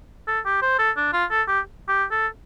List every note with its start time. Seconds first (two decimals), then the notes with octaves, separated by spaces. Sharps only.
0.28 A4
0.45 G4
0.62 C5
0.79 A4
0.97 D4
1.13 F4
1.30 A4
1.48 G4
1.88 G4
2.11 A4